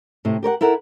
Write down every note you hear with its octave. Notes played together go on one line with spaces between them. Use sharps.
A2 C3
G4 A#4 C#5 F#5
E4 A4 A#4 F#5